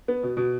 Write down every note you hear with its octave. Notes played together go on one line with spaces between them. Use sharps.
B3
B2
B2